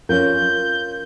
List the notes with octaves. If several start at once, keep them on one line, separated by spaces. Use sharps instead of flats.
C#4 F4 A#4 G6